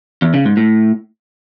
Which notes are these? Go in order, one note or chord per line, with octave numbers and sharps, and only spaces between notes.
E2
C#3
G#2
A2